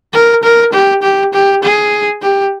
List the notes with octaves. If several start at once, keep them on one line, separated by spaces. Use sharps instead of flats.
A#4
A#4
G4
G4
G4
G#4
G4